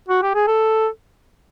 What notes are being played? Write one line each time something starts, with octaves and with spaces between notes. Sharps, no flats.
F#4
G4
G#4
A4